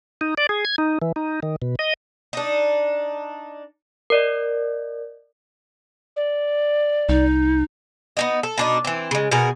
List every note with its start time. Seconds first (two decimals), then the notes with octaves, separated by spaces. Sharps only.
0.21 D#4
0.38 D5
0.49 G#4
0.65 G#6
0.78 D#4
1.02 E3
1.16 D#4
1.43 D#3
1.62 B2
1.79 D#5
2.33 D4 D#4
4.10 A#4 D5 D#5
6.16 D5
7.09 C2 D#4
8.17 B3 D#4 D#5
8.43 A4
8.58 B2 D4 D#4
8.84 E3 C4
9.11 C#3 G#3
9.31 B2 F#4 G#4 A#4